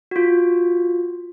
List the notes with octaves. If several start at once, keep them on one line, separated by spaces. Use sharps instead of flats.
F4 F#4